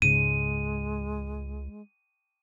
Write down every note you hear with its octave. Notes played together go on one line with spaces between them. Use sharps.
C#2 G#2 C#3 G#3 D#7